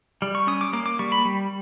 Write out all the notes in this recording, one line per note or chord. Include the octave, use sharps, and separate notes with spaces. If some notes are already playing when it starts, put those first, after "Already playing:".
G3
C#6
C#4 D#6
D6
A#3 D6
D6
G3 C#6
B5
G3